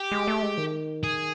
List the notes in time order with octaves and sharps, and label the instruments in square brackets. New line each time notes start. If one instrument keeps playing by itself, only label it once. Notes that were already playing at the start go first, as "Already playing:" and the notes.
Already playing: [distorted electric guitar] G4
[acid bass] G#3
A3
G#3
D#3
[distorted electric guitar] G#4